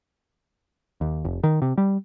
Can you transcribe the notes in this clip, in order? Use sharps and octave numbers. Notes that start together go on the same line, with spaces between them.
D#2
F1
D#3
C3
G3